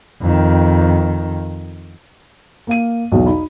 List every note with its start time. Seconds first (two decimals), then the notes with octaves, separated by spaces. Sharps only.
0.21 F2 D#3
2.67 A#3 F5 D#7
3.12 B1 E2
3.26 D#4 B5